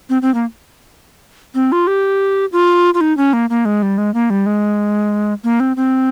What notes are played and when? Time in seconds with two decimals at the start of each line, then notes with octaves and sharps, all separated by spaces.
0.09 C4
0.22 C4
0.34 A#3
1.55 C4
1.72 F4
1.87 G4
2.52 F4
2.94 F4
3.01 D#4
3.17 C#4
3.33 A#3
3.50 A#3
3.65 G#3
3.82 G3
3.98 G#3
4.14 A#3
4.30 G3
4.46 G#3
5.44 A#3
5.60 C4
5.76 C4